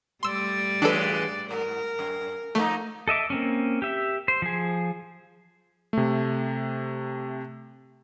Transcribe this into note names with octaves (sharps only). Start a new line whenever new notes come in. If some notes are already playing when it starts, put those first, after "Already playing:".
G3 A3 D5 C6 E6
E3 G#3 D4 A4 B4
G#2 A#4
F#2
F3 A3 A#3 D#4
A4 D#5 E5 D6
A#3 C4 C#4
G4 E5
C5
F3 G#4
C3 A3